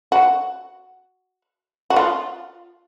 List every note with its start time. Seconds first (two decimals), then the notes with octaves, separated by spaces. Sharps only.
0.12 F#4
1.90 F#4
1.96 F4